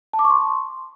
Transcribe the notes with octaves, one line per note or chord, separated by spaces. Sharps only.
A5
D6
C#6
C6